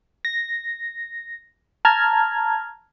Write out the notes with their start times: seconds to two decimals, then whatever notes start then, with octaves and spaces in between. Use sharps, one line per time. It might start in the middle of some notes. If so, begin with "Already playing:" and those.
0.25 A#6
1.85 A5 A#5 F6 G#6